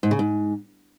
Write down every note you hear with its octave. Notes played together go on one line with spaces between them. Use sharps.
G#2
C#3
G#2